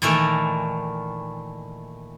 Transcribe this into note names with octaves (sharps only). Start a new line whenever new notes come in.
A#2 D#3 E3 A3 A#4